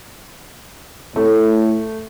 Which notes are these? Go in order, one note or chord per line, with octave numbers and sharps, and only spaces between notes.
A2 A3